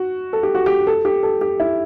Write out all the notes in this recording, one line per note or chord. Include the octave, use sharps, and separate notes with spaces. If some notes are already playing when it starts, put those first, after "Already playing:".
Already playing: F#4
A4
G4
F#4
G4
A4
G4
A4
G4
E4